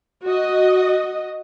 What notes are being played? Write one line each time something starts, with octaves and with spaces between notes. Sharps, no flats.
F#4 D#5